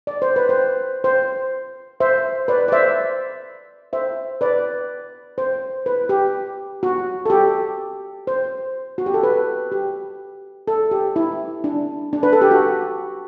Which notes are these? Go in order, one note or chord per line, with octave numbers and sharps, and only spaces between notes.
D5
C5
B4
C5
C5
C5 E5
B4 D5
D5
C5 E5
C5 E5
B4 D5
C5
B4
G4
F#4
A4
G4
C5
F#4
G4
A4
B4
G4
A4
G4
E4
D4
D4
B4
A4
G4
F#4